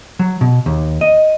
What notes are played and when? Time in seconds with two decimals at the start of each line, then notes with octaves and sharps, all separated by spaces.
0.19 F#3
0.41 B2
0.66 D#2
1.01 D#5